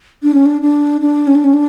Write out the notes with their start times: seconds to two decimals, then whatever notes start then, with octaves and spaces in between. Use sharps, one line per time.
0.23 D4
0.34 C#4
0.46 D4
0.62 D4
1.01 D4
1.27 C#4
1.35 D4
1.44 C#4
1.54 D4